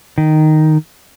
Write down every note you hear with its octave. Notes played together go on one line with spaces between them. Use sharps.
D#3